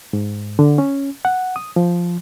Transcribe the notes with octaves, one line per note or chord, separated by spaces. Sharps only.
G#2
D3
C#4
F#5
D#6
F3